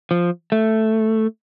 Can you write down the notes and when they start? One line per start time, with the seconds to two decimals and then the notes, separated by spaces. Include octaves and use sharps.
0.11 F3
0.52 A3